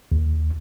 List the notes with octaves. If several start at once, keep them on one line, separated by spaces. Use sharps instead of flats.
D#2